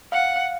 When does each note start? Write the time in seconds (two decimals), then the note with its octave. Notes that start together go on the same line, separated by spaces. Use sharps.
0.12 F5 F#5